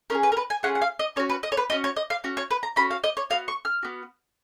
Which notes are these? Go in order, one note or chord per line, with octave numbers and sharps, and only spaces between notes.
C#4 F4 G#4 A#4
B4
A#4
B4
G#5
C#4 F4 G#4 F#5
F#5
F5
D#5
C#4 F#4 C#5
B4
D#5
C#5
B4
C#4 F#4 D#5
C#5
D#5
F5
C#4 F#4
C#5
B4
A#5
C#4 F#4 B5
F5
D#5
C#5
B3 F#4 F5
C#6
F6
B3 F#4